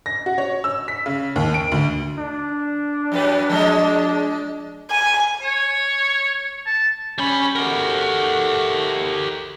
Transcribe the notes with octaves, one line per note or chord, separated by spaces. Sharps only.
A#6
F#4
C#5
E6
B6
C#3
D#2
D7
D2
D4
F#2 F#3 B4
F3 G#3 D#5
G#5
C#5
A5
G3 C#4 B5
A3 F#4 G4 A#4